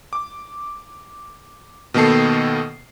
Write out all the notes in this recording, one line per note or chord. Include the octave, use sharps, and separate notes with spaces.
D6
B2 D#3 A#3 B3 A4 C7